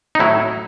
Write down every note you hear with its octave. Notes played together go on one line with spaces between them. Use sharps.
D#4
A2 F#3 E4